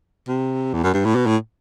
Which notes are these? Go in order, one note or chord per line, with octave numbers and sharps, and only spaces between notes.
C3
E2
F#2
G2
A2
B2
A2